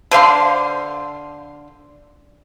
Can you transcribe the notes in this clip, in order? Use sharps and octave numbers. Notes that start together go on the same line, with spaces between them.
D3 C5 F5 C6